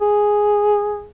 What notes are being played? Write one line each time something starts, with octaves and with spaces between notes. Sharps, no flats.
G#4